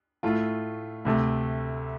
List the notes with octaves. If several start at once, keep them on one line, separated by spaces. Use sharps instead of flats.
A2 A3 F4
D2 C3 A3